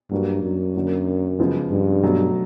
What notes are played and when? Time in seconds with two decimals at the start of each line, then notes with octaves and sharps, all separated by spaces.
0.11 G2 F#3 A#3 D4 F#4
0.43 F#2
0.74 D3 F#3 A#3 D4 F#4
1.39 C#3 F3 G#3 B3
1.71 G2
2.03 B2 F#3 A3